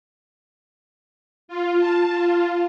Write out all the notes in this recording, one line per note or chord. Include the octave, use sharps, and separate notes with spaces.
F4
A5
F4